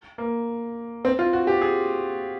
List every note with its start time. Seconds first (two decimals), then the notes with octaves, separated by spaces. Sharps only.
0.18 A#3
1.05 C4
1.19 F4
1.33 F#4
1.47 G4
1.61 G#4